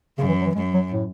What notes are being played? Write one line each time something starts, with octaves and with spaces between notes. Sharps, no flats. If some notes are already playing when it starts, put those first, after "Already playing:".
F#2 C#3
E3
F#3
E3
F#2 G#3
F#3
A2